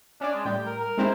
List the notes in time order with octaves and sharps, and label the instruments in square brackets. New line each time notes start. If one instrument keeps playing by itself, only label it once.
[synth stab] C#4 D5 [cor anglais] D4
[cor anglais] G#3
[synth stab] A2 G3 [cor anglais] G5
[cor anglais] A#4
A#4
[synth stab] G#3 C4 E4